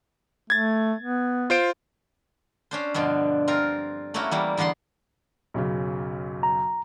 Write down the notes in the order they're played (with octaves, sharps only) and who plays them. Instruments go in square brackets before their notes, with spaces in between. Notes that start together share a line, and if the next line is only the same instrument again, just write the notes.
[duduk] A3 [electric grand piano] G#6 A6
[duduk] B3
[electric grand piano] F4 C5 D7
[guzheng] C#4 D4 C5
G2 B2 D3 F3
C4 F4 A#4
A3 A#3 C#4 E4 F#4
E3 G3 A#3
E2 D3 B3 F#5 C6
[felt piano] B1 F#2 C#3
[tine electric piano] A#5